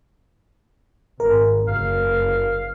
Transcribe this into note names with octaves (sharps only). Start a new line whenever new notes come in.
G#1 A#4
F#1 F5